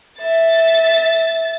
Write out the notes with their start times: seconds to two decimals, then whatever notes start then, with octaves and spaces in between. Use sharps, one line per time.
0.19 E5 A6